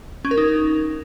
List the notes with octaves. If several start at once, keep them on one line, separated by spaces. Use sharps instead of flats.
C#4
A#4
D#4